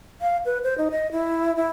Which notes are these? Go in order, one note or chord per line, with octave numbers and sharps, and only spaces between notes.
F5
B4
C5
D#4
D#5
E4
E4